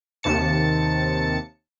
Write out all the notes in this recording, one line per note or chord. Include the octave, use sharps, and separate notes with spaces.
D#2 C3 A5 C#7